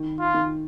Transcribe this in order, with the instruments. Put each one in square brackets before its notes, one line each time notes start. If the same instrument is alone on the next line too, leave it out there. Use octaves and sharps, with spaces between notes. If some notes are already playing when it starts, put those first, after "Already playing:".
Already playing: [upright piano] D#3
[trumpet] F4
[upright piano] D#3